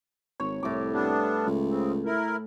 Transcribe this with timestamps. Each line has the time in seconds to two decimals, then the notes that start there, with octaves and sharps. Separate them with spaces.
0.40 G#1 C#5
0.63 C2 A2 D6
0.93 G3 B3 D4
1.47 C#2
1.70 C#3 C4
2.05 E4 A#4